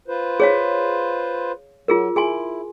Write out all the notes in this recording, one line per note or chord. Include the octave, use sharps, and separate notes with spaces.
F4 B4 C5
G#4 C#5 F5
F#3 F4 G#4 A#4
E4 G#4 G#5 C6